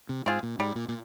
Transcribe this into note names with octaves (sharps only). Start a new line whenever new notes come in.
C3
G#2 C4 F4 G#4
A#2
G#2 G3
A#2
A#2